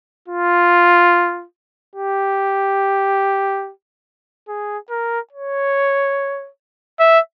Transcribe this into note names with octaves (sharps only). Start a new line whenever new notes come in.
F4
G4
G#4
A#4
C#5
E5